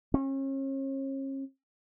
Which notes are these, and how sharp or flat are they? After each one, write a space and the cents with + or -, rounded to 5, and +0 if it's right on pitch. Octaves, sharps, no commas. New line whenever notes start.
C#4 -40